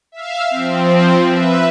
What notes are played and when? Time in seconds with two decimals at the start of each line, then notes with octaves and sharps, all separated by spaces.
0.12 E5 F5
0.51 F3 C4
1.27 B4 E5